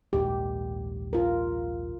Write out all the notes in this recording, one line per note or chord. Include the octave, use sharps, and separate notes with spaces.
A#1 D#2 G#2 G4
F4 A#4